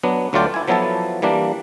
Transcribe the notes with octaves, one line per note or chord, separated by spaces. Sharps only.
F#3 B3 D4
D2 F#3 A3 F4 D5 G5
E4 G#5
F3 F#3 B3 E4 A4 A5
E3 G3 A#3 D4